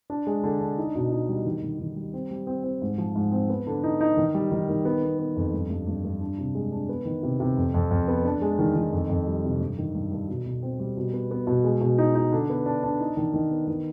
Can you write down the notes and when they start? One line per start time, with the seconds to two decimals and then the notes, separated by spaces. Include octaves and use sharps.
0.10 D4
0.27 G#3
0.44 D3
0.61 D4
0.78 D#4
0.95 B2
1.12 D#4
1.29 G3
1.46 D#3
1.62 D#3
1.80 D#3
1.96 G3
2.14 C4
2.31 G3
2.47 C4
2.64 C4
2.82 G#2
2.98 F3
3.15 G#2
3.32 C4
3.49 B3
3.67 D3
3.83 D#4
4.01 D#4
4.17 D#3
4.34 G3
4.51 D#3
4.69 D#3
4.85 B3
5.02 B3
5.19 B3
5.36 F2
5.53 G2
5.70 G2
5.87 G2
6.05 G2
6.21 D4
6.38 C3
6.55 G#3
6.72 D4
6.89 B3
7.05 D#3
7.23 C3
7.40 C3
7.57 F2
7.74 F2
7.91 F2
8.08 B3
8.25 D4
8.42 G#3
8.59 D#3
8.76 D#3
8.93 F2
9.09 F2
9.27 G3
9.44 C3
9.60 G2
9.78 D#3
9.95 G2
10.12 G2
10.28 B2
10.46 B2
10.62 C4
10.80 G3
10.97 B2
11.13 B3
11.31 B3
11.47 B2
11.64 G#3
11.81 B2
11.98 D#4
12.15 D#4
12.32 D3
12.49 B3
12.66 D4
12.83 D4
13.00 D#4
13.17 D#3
13.34 D#3
13.52 B3
13.68 D#3